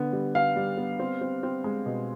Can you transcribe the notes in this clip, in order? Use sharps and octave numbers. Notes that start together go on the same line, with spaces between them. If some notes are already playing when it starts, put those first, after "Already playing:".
Already playing: D3 B3
G3
B3 F5
G3
B3
C4
C4
C4
G#3
B2